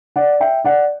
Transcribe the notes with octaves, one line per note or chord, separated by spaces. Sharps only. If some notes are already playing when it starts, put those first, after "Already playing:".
D5 F#5
E5 G5
D5 F#5